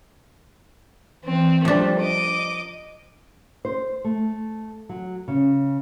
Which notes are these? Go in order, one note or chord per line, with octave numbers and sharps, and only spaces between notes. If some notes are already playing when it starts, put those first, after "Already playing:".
E3 C4
F3 G3 A3 D4
D#5 D6
C5
A3
F#3
C#3